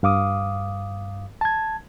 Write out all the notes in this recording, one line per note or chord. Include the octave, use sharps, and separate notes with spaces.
G2 F5 D6 D#6
A5 G#6